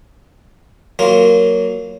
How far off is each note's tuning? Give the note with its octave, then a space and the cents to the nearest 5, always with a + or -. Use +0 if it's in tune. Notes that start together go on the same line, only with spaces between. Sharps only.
F#3 +10 A#3 +0 F4 +0